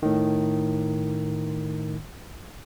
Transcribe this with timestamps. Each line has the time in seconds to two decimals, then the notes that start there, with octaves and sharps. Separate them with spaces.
0.03 A2 D#3